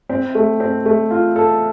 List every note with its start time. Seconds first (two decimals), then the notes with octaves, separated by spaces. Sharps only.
0.09 C4
0.35 A3
0.60 C4
0.86 A3
1.11 F4
1.36 A4